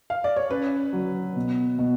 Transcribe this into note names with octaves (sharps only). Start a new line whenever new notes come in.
F5
D5
C#5
C#4 B4
F#3
B2
B2